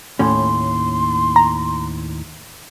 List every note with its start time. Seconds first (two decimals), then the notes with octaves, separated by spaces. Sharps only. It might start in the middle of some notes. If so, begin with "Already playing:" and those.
0.19 D#2 A2 C#4 C6
1.36 A#5